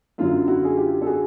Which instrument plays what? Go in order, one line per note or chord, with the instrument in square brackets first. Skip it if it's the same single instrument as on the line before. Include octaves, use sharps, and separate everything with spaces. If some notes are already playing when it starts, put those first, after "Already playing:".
[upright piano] F#2 D3 F#3 F4
E4 F#4
G#4
F4 G4
A4
F#4 G#4